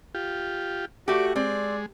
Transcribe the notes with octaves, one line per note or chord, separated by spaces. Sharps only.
F4 G4
A3 F#4 G4 D5
G#3 C4 D5